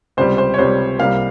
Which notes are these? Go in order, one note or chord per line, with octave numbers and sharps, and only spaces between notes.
C#2 C3 G3 C5
C5
C#5
C#2 C3 G3 C5
C2 C3 G3 A#3 F5